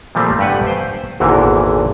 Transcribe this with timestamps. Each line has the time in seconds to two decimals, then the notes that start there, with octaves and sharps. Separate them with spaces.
0.15 A#2 F3 G3 A3 A#3 C4
0.39 G2 A3 G4 B4 F#5 G#5
0.67 C5 G5 G#5
1.20 G#1 E2 A#2 D3 E3 A#4